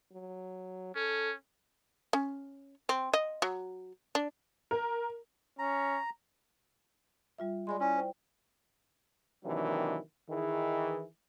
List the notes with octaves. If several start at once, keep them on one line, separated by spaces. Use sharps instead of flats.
F#3
C#4 A4
C#4
C4
D#5
F#3
D4
A#4
C#4 A#5
G3 F4 E5
G#3 D5 B5 C6
C#4 E4 D5
C5 G5
C3 D#3 E3 F#3 A#3 D4
D#3 E3 G#4